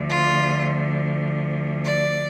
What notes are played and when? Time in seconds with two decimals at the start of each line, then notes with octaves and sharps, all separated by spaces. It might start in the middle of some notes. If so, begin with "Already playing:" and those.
Already playing: D2 D3 F3
0.10 F4
1.84 D5